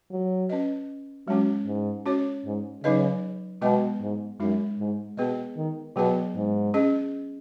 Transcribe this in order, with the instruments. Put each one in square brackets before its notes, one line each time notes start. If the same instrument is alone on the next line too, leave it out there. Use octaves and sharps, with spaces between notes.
[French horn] F#3
[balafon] C#4 B4 D#5
[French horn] F#3 [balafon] G#3 C#4 F#4
[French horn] G#2
[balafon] C#4 F#4 C#5
[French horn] G#2
[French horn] C#3 [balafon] F#3 D#4 B4 D#5
[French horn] B2 [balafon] G#3 B3 F#4 D#5
[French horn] G#2
[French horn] F#2 [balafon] G#3 D#4 F#4
[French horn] G#2
[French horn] B2 [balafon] B3 G#4 B4 D#5
[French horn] D#3
[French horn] B2 [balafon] F#3 B3 G#4 B4 D#5
[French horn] G#2
[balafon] C#4 G#4 D#5